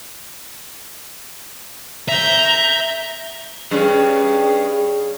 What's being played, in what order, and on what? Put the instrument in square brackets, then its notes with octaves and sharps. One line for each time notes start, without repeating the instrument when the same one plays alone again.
[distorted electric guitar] E5 [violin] A#5 G6
[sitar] G2 C#4 [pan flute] G#4